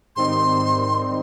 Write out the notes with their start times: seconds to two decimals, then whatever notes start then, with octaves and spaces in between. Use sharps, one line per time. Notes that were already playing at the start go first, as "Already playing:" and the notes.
0.16 G#2 D#3 G3 C4 D#4 C6